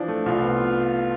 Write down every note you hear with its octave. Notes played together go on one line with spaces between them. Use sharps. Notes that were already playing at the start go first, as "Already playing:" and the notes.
Already playing: E3 F3 D4
A3
C2 F4
B3